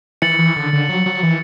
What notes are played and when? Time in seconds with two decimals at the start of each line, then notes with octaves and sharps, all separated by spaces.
0.22 E3 A6 C#7 F#7
0.39 E3
0.56 D3
0.73 D3
0.89 F#3
1.06 F#3
1.23 E3